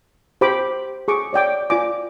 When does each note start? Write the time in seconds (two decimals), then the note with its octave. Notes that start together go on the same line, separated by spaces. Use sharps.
0.41 G4 C5 G5 B5 D6
1.08 G#4 C#6 D6
1.33 C#5 D5 G5 D6
1.70 F4 D5 G#5 D6